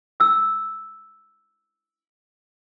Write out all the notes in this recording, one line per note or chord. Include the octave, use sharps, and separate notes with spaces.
D#6 E6